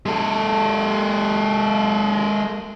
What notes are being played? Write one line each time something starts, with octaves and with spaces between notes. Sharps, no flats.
G#3 A4